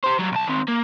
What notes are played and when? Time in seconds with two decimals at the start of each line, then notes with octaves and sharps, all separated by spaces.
0.03 G4 C5
0.19 F#3 G3
0.32 B1 A5
0.47 D#3 C4
0.68 A#3